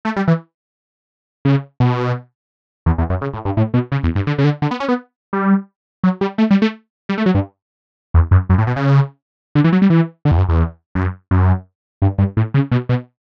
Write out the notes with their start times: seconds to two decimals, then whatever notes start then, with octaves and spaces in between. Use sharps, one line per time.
0.05 A3
0.16 G3
0.28 E3
1.45 C#3
1.80 B2
2.86 E2
2.98 E2
3.10 F#2
3.21 C#3
3.33 A2
3.45 G2
3.57 A2
3.74 B2
3.92 C#3
4.03 E2
4.15 G2
4.27 D3
4.38 C#3
4.44 D3
4.62 D3
4.71 B3
4.80 C#4
4.88 B3
5.33 G3
6.04 F#3
6.21 G3
6.38 A3
6.51 G3
6.62 A3
7.09 G3
7.18 A3
7.26 F#3
7.35 G2
8.14 E2
8.31 F#2
8.50 F#2
8.58 A2
8.67 B2
8.76 C#3
9.55 D3
9.64 E3
9.72 F#3
9.82 G3
9.90 E3
10.25 D3
10.31 E2
10.38 F#2
10.49 E2
10.95 F#2
11.31 F#2
12.02 G2
12.18 G2
12.37 A2
12.54 C#3
12.71 B2
12.89 B2